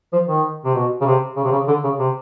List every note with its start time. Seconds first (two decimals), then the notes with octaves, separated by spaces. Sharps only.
0.13 F3
0.28 D#3
0.65 C3
0.75 B2
1.01 C#3
1.06 C3
1.37 C#3
1.44 C3
1.52 C#3
1.68 D3
1.84 C#3
1.99 C3